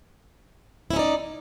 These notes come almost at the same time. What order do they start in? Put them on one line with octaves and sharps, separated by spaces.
E4 C#4 D#4 D5